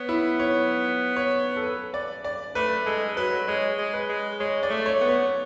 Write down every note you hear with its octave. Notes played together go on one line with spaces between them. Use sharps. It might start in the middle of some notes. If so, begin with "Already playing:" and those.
Already playing: B3 C#5
E4
C#5
C#5
A4
B4
D5
D5
A3 B4
G#3 A4
F#3 B4
G#3 C#5
G#3
B4
G#3
G#3 C#5
D5
A3
C#5
B3
C#5